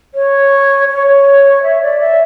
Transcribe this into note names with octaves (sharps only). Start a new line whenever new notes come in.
C#5
C#5
E5
D5
E5